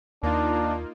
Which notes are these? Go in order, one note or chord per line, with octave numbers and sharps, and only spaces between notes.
D#2 A#3 D4 D#4 F4